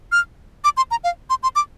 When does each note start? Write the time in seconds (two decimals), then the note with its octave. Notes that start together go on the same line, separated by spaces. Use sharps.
0.12 F6
0.64 D6
0.77 C6
0.91 A#5
1.04 F5
1.30 C6
1.43 C6
1.56 D6